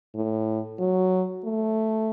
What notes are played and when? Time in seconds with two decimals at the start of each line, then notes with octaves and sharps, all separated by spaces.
0.15 A2
0.79 F#3
1.45 A3